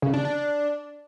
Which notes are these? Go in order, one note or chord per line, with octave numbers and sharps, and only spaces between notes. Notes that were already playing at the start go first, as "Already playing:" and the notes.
C#3
D4
D4